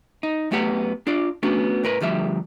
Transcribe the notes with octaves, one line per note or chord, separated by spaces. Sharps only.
D#4
F#2 A3 B3 G4 F#5
D4 F4 D5
A3 B3 C#4 D4 F#4
A2 A#4 B4
D2 F3 G3 E5